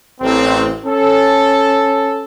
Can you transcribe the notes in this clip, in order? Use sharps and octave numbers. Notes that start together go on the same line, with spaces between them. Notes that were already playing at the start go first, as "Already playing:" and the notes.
A1 C4
C#4 A4